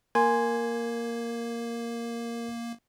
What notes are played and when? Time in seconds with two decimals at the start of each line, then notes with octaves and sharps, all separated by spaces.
0.15 A#3 A#4 G#5 C6 G#6